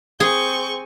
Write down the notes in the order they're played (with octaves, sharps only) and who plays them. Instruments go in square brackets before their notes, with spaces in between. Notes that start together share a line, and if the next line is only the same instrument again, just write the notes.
[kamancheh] C4 G#5 [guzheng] G#4 [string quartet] C#6 G6